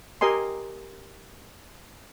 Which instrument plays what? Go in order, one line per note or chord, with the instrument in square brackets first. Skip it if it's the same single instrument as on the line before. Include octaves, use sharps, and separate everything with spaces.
[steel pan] G4 A#4 D#5 G#5 C6